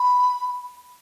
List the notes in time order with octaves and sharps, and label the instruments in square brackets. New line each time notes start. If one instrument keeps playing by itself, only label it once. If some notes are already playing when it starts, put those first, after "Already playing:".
Already playing: [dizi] B5